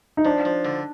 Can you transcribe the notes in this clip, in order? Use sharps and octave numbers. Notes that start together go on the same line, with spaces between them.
D#4
F3 D4
F3
D3